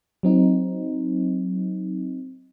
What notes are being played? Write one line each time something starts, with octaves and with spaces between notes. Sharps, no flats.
F#3 C4 D#4